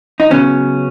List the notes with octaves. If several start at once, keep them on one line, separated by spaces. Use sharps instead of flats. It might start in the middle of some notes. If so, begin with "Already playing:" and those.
D#4
C#3 F#3 B3 C#4